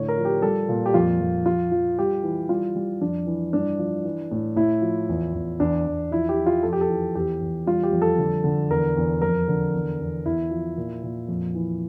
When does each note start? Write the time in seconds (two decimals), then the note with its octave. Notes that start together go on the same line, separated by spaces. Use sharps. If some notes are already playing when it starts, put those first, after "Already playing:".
Already playing: A2 D3 C#5
0.09 A#4
0.17 F3
0.25 G4
0.42 G3 A4
0.69 A#2
0.86 G4
0.94 F2 F4
1.21 F2
1.46 F3 F4
1.72 F3
1.99 G3 G4
2.23 E3
2.49 G3 F4
2.76 G3
3.01 F2 D4
3.27 E3
3.53 G2 D4
3.79 F3
4.05 E3
4.31 A2
4.56 A2 E4
4.82 F3
5.09 E2
5.34 E2
5.60 E2 D4
5.86 E2
6.11 F3 E4
6.29 G4
6.38 F3
6.46 F4
6.63 F2 A4
6.73 G4
6.81 A4
6.89 E3
7.15 E2 G4
7.41 E2
7.66 G3 F4
7.83 G4
7.92 F2
8.02 A4
8.18 D3
8.44 D3
8.70 E2 A#4
8.97 E2
9.22 F2 A#4
9.48 D3
9.74 E2
10.00 E2
10.26 E2 E4
10.51 F3
10.78 A#2
11.03 A#2
11.28 F2
11.55 E3